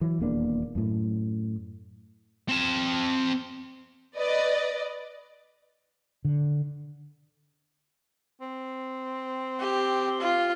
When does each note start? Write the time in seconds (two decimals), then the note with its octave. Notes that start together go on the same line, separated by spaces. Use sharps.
0.01 E3 F#3
0.19 D#1 E2 A#3 D4
0.75 F#2 A2
2.49 C4 A5
4.17 B4 D5 D#5
6.25 D3
8.41 C4
9.61 G4
10.20 F4